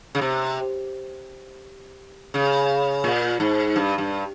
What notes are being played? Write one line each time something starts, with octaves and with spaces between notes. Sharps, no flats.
C#3
C3
C#3
A#2
G#2
G2
G2